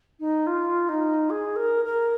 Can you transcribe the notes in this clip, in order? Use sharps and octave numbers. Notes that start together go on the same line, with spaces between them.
D#4
F4
D#4
G#4
A#4
A#4